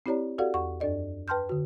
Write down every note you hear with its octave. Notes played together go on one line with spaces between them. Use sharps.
C4 E4 G4 C#5 D5 A#5
F#4 G4 A4 D5 F5 F#5
E2 F#5 C#6
F#2 D4 A4 D5 D#5
B4 G5 A5 C6 F6 G6
D3 F#4